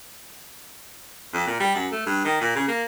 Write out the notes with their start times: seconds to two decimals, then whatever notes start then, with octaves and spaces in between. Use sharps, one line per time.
1.34 F2
1.47 A#2
1.60 G3
1.75 F#2
1.92 A3
2.06 G2
2.25 D#3
2.41 A#2
2.55 C#3
2.68 A#3